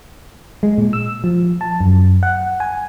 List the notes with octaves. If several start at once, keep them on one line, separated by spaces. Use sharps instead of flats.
G#3
A#2
E6
F3
A5
F#2
F#5
G#5